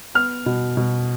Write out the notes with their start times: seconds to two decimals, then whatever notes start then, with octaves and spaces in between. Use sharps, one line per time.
0.14 B3 F6
0.46 B2
0.77 B2